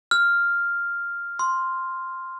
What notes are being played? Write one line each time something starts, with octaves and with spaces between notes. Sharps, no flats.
F6
C6